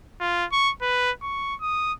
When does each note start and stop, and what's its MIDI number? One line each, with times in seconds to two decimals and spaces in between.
0.20 0.45 65
0.52 0.71 85
0.82 1.11 71
1.22 1.55 85
1.61 1.93 87